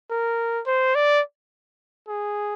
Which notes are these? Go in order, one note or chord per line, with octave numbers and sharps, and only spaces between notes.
A#4
C5
D5
G#4